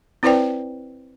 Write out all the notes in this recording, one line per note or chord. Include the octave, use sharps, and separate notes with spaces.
C4 E4 B4 C5 D5 G5